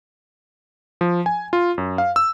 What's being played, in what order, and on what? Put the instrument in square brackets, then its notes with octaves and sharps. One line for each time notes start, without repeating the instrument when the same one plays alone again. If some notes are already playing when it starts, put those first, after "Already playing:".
[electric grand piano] F3
G#5
F4
F#2
F5
E6